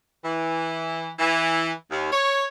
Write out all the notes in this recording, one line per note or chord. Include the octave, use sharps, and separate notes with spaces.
E3
E3
D#2
C#5